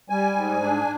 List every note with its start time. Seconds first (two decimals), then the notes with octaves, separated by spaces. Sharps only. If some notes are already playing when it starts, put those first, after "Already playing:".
0.09 G3 G#5
0.36 G#2
0.62 D4